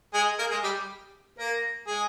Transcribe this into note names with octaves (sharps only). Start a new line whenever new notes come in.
G#3 G#4
A#3 A#4
G#3 G#4
G3 G4
A#3 A#4
G#3 G#4